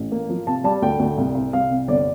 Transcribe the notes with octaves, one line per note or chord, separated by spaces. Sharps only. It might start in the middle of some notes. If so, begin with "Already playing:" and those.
Already playing: A1
A#3
F3
C3 A5
G3 A5
D2 G5
D2
C2
C2
C2 F5
C3
G1 D5